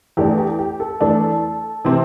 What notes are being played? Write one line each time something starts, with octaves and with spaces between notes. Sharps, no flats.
E2 E3 A3 D4 G4
G4
G4
A4
E2 E3 A3 D4 A4
C3 E3 C4